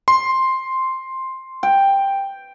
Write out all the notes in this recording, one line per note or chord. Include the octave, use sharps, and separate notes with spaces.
C6
G5